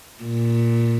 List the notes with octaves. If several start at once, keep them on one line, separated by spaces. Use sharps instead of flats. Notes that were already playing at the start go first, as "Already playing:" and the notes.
A#2